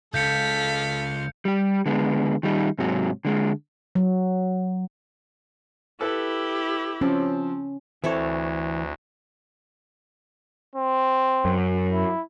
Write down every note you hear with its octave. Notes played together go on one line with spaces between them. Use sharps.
C#2 A4 F5 G6 B6 C#7
G3 G4
D3 G#3 B3
D#3 G3 D#4
G#2 C3 F#3
D3 G#3
F#3
E4 G4 A4 B4
F3 C4 C#4
D2 E3 C4 E4 A4 C#5
C4
F#2
E4